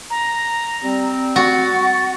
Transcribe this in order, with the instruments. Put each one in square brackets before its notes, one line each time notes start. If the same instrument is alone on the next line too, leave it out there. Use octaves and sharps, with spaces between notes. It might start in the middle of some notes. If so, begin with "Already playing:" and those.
[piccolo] A#5
[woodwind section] G3 C4
[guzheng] F#4 [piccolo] A6